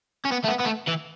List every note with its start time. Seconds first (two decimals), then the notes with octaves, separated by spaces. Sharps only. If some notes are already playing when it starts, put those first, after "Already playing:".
0.25 C#4
0.32 B3
0.45 A3
0.48 B3
0.60 B3
0.66 A3
0.88 E3